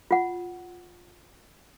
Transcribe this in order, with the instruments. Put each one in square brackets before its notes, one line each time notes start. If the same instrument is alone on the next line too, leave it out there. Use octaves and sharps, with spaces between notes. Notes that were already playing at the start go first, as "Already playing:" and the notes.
[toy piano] F4 F#5